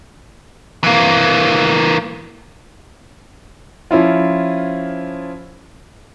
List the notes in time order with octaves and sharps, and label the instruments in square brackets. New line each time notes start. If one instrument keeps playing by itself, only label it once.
[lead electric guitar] E3 A#3
[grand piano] F3 C#4 E4 F4